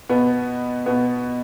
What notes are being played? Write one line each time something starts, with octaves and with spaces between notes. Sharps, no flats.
B2 B3
B2 B3